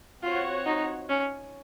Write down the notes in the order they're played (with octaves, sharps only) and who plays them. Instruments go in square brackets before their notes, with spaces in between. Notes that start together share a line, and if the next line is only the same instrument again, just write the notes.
[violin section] C4 F#4 C#5 F#5 [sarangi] F4
[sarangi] D#4
C#4